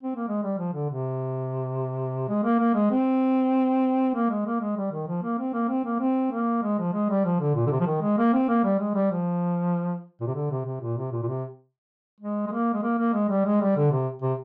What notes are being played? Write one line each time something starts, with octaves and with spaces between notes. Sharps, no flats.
C4
A#3
G#3
G3
F3
D3
C3
G#3
A#3
A#3
G#3
C4
A#3
G#3
A#3
G#3
G3
D#3
F3
A#3
C4
A#3
C4
A#3
C4
A#3
G#3
F3
G#3
G3
F3
D3
A#2
D3
C3
F3
D#3
G#3
A#3
C4
A#3
G3
G#3
G3
F3
A#2
C3
D3
C3
C3
A#2
C3
A#2
A#2
C3
G#3
G#3
A#3
G#3
A#3
A#3
G#3
G3
G#3
G3
D3
C3
C3